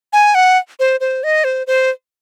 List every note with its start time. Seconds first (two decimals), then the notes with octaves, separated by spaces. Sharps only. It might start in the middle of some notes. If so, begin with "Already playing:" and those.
0.13 G#5
0.35 F#5
0.80 C5
1.00 C5
1.24 D#5
1.44 C5
1.67 C5